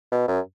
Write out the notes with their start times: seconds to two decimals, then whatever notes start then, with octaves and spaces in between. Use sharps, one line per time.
0.12 B2
0.28 F#2